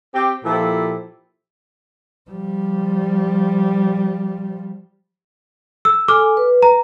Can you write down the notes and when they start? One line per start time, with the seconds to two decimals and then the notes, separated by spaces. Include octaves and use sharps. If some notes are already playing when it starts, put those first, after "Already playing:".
0.14 C4 G4
0.44 A#2 F3 E4 G4 A4
2.31 F3 G3
5.85 E6
6.08 A4 G#5 D6 F6
6.37 B4
6.63 A#5